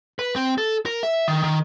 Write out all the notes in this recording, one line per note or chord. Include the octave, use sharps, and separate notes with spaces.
B4
C4
A4
A#4
E5
D#3
D#3